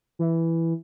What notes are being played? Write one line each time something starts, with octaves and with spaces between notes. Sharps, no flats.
E3